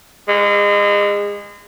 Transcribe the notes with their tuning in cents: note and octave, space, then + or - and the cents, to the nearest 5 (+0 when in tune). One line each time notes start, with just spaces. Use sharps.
G#3 -30